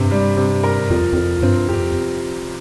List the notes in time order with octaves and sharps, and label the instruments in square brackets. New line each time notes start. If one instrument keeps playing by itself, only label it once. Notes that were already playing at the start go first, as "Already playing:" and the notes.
Already playing: [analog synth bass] G2 [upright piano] C3
[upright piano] G3
C3
A#4
[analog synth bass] F2 [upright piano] F3
[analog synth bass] F2 [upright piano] F3
[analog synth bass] G2 [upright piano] C4
[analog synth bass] F2 [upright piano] G4